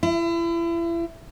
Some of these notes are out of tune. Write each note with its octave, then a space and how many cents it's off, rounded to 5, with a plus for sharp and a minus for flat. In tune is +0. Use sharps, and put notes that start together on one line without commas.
E4 +35